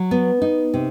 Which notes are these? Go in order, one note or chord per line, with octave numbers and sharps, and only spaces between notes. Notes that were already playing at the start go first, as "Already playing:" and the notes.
Already playing: F#3
B3
D#4
C3